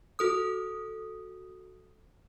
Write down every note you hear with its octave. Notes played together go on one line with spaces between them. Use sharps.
F#4 A4 D#6